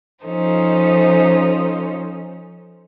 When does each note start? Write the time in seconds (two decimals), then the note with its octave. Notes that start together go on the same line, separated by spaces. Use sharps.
0.24 F3 C#4 D#4 A4 C5